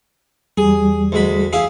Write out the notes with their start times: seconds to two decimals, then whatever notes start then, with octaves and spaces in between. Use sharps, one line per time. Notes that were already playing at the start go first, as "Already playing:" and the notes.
0.57 E2 G3 G#4
1.12 D2 G#3 B5
1.53 E4 G#4 F5